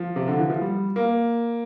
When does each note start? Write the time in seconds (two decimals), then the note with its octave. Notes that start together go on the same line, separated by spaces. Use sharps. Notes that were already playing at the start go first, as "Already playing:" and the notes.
Already playing: F3
0.16 C3
0.28 D3
0.39 E3
0.50 F3
0.61 G3
0.96 A#3